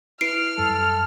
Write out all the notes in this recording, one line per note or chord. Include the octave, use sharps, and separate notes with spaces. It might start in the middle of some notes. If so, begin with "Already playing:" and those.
E4 B4 F6 C7 D7
F#2 G3 A4